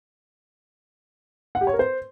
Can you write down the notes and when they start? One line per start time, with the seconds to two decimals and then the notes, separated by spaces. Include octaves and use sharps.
1.55 F#5
1.61 G4
1.67 C#5
1.73 A#4
1.79 C5